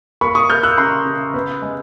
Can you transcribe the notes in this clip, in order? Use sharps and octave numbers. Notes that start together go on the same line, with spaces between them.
A#3 B5 C#6
C#6 D#6
A#3 F6 G6
E6 F#6
C#3 A#5 C6
C#3
B3
G#3